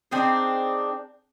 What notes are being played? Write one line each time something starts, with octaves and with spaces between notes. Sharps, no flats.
C4 D4 D#4 G#4